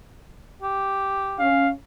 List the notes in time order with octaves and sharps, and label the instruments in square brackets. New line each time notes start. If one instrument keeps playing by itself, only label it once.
[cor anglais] G4
[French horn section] C#4 [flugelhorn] F5